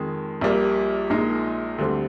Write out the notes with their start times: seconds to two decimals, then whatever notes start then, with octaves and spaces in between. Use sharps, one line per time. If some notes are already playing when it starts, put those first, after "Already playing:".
Already playing: F2 D#3 G#3
0.41 A#1 A#2 G3 A#3
1.10 A#1 A#2 G#3 D#4
1.78 D2 D3 G3 C4